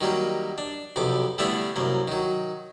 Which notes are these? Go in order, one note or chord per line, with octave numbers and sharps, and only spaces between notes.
D#3 F#3 G3 A#3
D4
B1 F2 C3 D6
D3 G3 A3 B3 D4 E4
C2 F#2 A#3
D#3 F#3